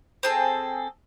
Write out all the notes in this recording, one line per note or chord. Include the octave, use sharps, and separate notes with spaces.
C4 G#4 A4